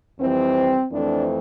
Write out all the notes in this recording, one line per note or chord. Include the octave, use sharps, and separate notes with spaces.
F2 E3 G3 C4
F2 E3 A3 C4 D4